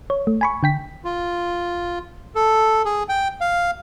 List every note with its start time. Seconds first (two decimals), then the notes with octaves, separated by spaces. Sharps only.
0.10 C#5
0.27 A3
0.41 G#5 B5 C#6
0.63 D3 G5 B6
1.04 F4
2.35 A4
2.85 G#4
3.09 G5
3.41 F5